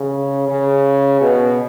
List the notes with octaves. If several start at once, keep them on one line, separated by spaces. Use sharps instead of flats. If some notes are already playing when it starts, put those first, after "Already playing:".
Already playing: C#3
C#3
B2